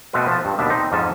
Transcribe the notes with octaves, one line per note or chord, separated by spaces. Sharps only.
B2 A3 C4 F#4 B4
F3 A5
G2
D#2 B2 D4 E5
C4 D#4
F2 G#2 C#4 G#5 A5